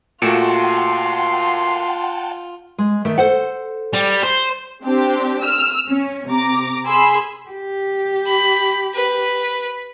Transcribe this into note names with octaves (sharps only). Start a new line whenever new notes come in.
A#2 A3 F4 F#4 F#5 G5 A5 C6
G#3
D#3 A3 E5
A4 C5 F#5
G3
C5
C4 D4 G4 C5
E6 F6
C#4
C3 A#5 D6
G#4 G#5 B5 C6 E6
G4
B5
B4